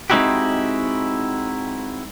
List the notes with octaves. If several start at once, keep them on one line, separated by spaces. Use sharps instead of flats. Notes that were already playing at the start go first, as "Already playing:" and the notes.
G#3 C4 D#4 E4 F#4 G4